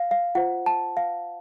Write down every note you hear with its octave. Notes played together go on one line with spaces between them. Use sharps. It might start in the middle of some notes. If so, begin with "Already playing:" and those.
Already playing: F5
F5
F4 C5 F#5
A5
F5